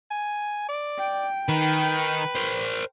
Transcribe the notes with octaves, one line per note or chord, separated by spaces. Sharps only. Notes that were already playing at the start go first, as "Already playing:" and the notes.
G#5
D5
G5
D#3 B4
A#4 C5